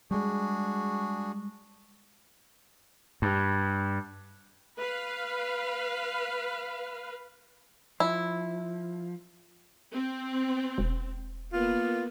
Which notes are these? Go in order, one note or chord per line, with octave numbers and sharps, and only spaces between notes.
G3 G#3 D4 F#4 G#4
G2
B4 F5
F3 E4
C4
E1
A#3 B3 F4